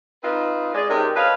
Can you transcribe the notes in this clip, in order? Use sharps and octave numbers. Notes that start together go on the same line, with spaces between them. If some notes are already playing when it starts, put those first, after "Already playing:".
C4 D#4 F4 B4
G#3 G#4 D5
C3 G#3 C#4 D#4 G4 A#4
A4 B4 C#5 D#5 F5